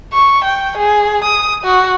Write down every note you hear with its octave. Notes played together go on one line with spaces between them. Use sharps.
C#6
G5
G#4
D#6
F#4